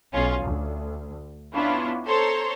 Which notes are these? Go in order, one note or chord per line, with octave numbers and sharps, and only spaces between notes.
B1 C#4 F4
D2
B3 C#4 D4 E4 F4
A4 C5 C#5 A#5 C6